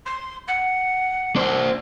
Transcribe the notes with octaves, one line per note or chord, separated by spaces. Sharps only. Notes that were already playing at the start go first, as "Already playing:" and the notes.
C6
F#5
D4 C5